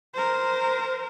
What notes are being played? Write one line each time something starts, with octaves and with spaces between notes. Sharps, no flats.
A#4 C5